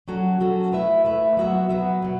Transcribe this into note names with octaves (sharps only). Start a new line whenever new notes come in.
F#3 C#4 F#4 A4
F#3 C#4 F#4 A4
A3 E4 B4 E5
A3 E4 B4 E5
F#3 B3 F#4 B4 E5
F#3 B3 F#4 B4 E5
B2 F#3